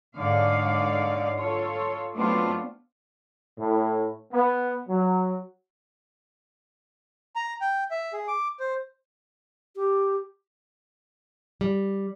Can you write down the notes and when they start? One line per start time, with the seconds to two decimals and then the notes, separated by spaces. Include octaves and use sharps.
0.16 G#2 D3 D#4 C#5 D5 F5
1.36 F4 A4 C#5
2.15 F#3 A3 B3 C4 D4 F4
3.59 A2
4.32 B3
4.88 F#3
7.36 A#5
7.61 G5
7.91 E5
8.13 G#4
8.28 D6
8.60 C5
9.76 G4
11.61 G3